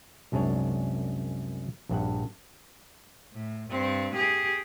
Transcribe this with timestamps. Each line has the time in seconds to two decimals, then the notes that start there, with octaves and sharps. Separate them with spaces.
0.32 C2 F#2 G#3 D4 C#5
1.89 A#1 G2 F#5
3.33 A2
3.70 G2 C4
4.14 G4 G#4